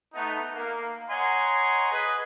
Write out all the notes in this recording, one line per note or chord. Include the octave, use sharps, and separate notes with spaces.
A3 B3 D#4
A#3
C#5 D#5 F#5 G#5 A#5 C6
G#4 B4 D#5